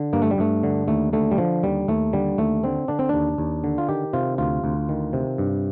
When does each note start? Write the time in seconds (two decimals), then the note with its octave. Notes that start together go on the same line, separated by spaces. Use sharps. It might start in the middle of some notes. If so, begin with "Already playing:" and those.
Already playing: D3
0.13 G2 A#3
0.22 A3
0.31 G3
0.38 G2 A3
0.63 D3
0.88 D#2 A3
1.13 D3 A3
1.31 G3
1.38 D3 F3
1.63 D#2 G3
1.88 D#2 A3
2.13 D3 G3
2.38 D#2 A3
2.64 D3 C4
2.88 D3 D4
2.99 C4
3.09 D#2 D4
3.38 D#2
3.64 D3
3.78 F4
3.88 D#3 G4
4.13 C3 F4
4.38 D2 F4
4.64 D2
4.89 D#3
5.13 C3
5.38 G2